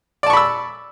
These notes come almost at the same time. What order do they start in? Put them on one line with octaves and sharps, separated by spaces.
D5 A5 C#6 B5 E6